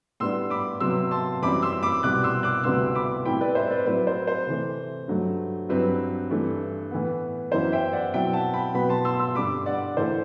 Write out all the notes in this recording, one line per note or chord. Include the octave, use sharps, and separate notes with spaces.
A2 G3 B3 D4 C6 E6
B5 D6
C3 F#3 B3 C6 E6
A5 C6
F#2 E3 G3 C4 E4 B5 D6
C6 E6
B5 D6
C2 B2 G3 C4 D6 F#6
C6 E6
D6 F#6
D2 C3 G3 B3 D4 C6 E6
B5 D6
A2 G3 C4 E4 G5 B5
B4 D5
C5 E5
B4 D5
A2 F#3 C4 E4 B4 D5
C5
C5
C3 E3 A3
G2 F#3 A3
G2 F#3 C4 E4 B4
G2 E3 A3 E4
A2 E3 B3
F#2 E3 B3 E4 C5
E5 G5
D5 F#5
B2 F#3 C4 E4 E5 G5
F#5 A5
G5 B5
B2 F#3 B3 G5 B5
A5 C6
C6 E6
C6 E6
G2 D3 G3 B5 D6
D5 F#5
A2 E3 A3 E4 C5